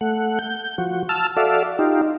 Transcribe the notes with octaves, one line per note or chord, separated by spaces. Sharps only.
A3 F#5
G6
F3 F#4
A5 E6 F6
F#4 A4 D5 E5 F5
D#4 F4 G4